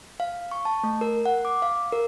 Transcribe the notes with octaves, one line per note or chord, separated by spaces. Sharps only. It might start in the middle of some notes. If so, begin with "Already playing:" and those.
F5
C#6
A5
A3
A#4
F#5
D6
F5
A#4